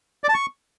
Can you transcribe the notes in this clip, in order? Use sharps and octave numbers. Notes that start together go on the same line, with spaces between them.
D5
A5
C#6